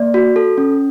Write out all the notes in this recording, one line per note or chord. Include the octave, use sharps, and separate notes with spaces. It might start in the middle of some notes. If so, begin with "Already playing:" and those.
Already playing: A#3 D5
F#4
A4
C#4